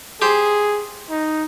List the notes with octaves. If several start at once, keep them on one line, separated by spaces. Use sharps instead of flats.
G4 G#4 C5
D#4